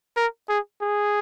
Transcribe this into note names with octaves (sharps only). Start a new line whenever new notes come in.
A#4
G#4
G#4